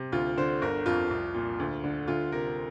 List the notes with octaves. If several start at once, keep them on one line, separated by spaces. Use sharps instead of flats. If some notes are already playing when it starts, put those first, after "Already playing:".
Already playing: C3
D2 F4
D3 C5
G1 A#4
F2 F4
C2
A#2
D2
D3
D2 F4
C3 A#4